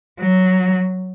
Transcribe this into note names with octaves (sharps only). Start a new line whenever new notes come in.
F#3